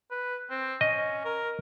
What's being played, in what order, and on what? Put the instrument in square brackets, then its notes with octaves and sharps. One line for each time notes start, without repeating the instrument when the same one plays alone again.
[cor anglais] B4
C4
[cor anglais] C#4 [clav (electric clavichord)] D#5
[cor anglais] A#4